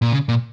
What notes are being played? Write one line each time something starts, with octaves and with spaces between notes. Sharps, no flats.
A#2
C#3
A#2